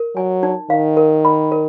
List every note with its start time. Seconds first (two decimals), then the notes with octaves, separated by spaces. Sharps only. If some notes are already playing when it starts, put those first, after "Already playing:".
Already playing: A#4
0.16 F#3 G#5
0.43 D#4
0.70 D#3 F5
0.97 A#4
1.25 B5
1.52 A#4